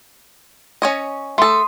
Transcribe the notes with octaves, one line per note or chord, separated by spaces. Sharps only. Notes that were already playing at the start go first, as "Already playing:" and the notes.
C#4 C#5 D#5
A3 A4 C6 D#6